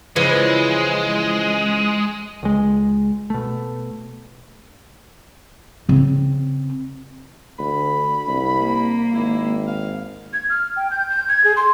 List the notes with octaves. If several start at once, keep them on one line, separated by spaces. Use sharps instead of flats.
C#3 E3 F3 G#3
C#2 G#3
B2 A3
C#3 C4
D2 B5
C2
A#3
G#1 E4
F5
G#6
F6
G5
G6
G6
G#6
G#4
C6